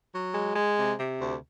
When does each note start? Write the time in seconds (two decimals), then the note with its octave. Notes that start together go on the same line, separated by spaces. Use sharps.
0.14 F#3
0.34 G#3
0.56 G#3
0.78 C3
0.98 C3
1.20 D2